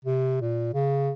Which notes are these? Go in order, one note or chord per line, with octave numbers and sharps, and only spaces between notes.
C3
A#2
C#3